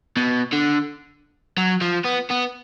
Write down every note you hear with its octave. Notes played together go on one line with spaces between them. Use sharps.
B2
D3
F#3
F3
B3
B3